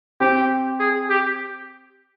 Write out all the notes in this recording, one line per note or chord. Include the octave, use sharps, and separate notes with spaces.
C4 G4
G#4
G4